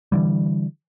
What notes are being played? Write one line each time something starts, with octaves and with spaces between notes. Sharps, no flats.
D3 E3 G3